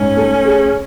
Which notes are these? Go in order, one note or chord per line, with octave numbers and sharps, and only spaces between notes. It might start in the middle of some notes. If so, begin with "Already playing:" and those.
Already playing: G#2 C#4
A3
G#4